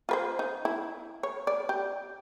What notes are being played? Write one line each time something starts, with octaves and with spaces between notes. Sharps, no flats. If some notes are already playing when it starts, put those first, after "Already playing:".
F4 B4 C5
D#4
E4
C#5
D5
G4